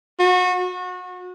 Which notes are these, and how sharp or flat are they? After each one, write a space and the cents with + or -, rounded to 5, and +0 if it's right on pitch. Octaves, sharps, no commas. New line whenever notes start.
F#4 -30
F#4 -30